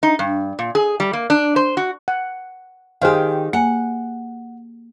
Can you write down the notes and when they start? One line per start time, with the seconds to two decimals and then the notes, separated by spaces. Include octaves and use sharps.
0.03 D#4
0.19 G2
0.59 A#2
0.75 G#4
1.00 G3
1.13 A#3
1.30 D4
1.56 C5
1.77 F#4
2.08 F#5
3.02 D#3 G4 G#4 C5 F5
3.53 A#3 F#5 G#5